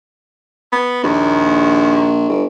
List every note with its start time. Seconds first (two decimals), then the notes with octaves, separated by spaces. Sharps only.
0.73 B3
1.04 A#1 D#2
2.29 G1